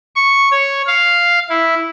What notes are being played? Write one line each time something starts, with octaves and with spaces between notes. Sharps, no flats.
C#6
C#5
F5
E4